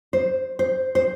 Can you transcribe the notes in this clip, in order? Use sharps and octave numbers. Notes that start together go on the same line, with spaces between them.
C5
C5
C5